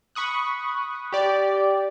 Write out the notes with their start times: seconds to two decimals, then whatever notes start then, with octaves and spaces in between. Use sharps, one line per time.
0.15 B5 C#6 D#6 F#6
1.12 G4 D5